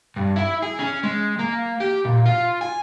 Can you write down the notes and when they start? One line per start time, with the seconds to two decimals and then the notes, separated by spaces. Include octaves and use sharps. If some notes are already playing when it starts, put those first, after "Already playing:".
0.16 G2
0.36 E4
0.62 G#4
0.79 C#4
1.03 G#3
1.39 A#3
1.80 G4
2.05 A#2
2.25 F4
2.61 G#5